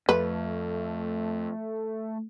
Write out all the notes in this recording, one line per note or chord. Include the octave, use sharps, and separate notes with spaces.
F2 A3 B4